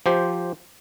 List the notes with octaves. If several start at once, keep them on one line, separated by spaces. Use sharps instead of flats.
F3 G4 C5